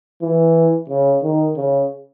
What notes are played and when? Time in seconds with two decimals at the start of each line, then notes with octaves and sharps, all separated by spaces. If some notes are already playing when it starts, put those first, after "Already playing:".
0.22 E3
0.90 C#3
1.23 D#3
1.57 C#3